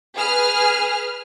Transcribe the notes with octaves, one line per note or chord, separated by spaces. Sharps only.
G#4 B4 F6